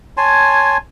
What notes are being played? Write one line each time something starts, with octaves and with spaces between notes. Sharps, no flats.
C#5 G#5 A5 C6